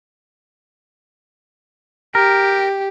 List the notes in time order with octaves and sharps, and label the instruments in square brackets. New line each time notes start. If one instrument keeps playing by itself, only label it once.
[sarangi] G4 [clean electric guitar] A#4